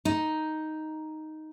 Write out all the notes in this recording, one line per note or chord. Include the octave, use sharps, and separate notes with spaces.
D#4